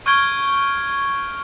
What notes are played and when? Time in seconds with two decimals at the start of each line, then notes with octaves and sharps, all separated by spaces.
0.06 C#6 F6 G6 G#6 D7 G7